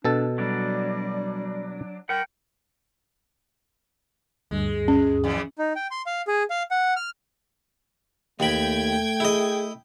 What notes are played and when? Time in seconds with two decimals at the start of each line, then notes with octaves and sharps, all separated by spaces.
0.05 B2 D4 A4 A5
0.38 F#3 G3 D4
2.09 A#4 F#5 G5
4.51 D2 G2 G#3
4.88 C#4
5.24 F2 C#3 E3
5.59 D#4
5.76 G5
5.91 C6
6.06 F5
6.28 G#4
6.50 F5
6.71 F#5
6.96 F6
8.40 D#2 A3 G5 B5 G#6
9.20 E4 G#4 D#5